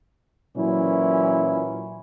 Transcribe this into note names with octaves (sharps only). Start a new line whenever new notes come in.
A#2 E3 F#3 C#4 E4